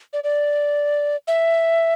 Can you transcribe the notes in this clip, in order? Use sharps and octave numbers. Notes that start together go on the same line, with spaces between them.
D5
D5
E5